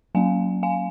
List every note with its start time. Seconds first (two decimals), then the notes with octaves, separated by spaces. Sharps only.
0.15 F#3 A#3 C#4 F5 G#5
0.63 F5 G#5